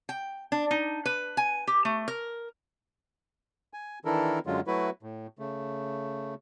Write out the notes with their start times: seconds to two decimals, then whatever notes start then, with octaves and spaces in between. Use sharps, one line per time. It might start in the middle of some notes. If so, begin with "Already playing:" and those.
0.09 G5
0.52 D4
0.71 D#4
1.05 B4
1.37 G#5
1.67 G4
1.85 A3
2.08 A#4
3.73 G#5
4.05 D#3 E3 D4 E4 A4 A#4
4.46 F#2 D3 F#3 G#3 F4
4.67 F#3 A3 E4 F#4 B4
5.03 A2
5.39 C#3 A3